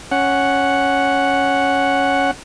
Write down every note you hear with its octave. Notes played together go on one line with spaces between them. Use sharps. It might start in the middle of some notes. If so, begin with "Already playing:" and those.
C#4 F#5